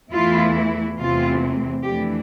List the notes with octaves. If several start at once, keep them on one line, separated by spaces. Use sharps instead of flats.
E2 E3 A3 E4 F4
E2 C3 E3 A3 C4 F4
F2 E3 A3 D4 G4